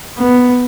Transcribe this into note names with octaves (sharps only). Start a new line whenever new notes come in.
B3